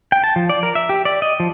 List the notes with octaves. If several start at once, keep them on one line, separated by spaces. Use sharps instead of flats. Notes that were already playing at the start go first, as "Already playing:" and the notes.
G5
A5
F3
D5
A#4
E5
G4
D5
D#5
F3